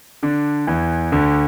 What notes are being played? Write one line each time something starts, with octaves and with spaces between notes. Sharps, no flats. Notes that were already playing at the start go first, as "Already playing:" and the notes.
D3 D4
E2 E3
D2 D3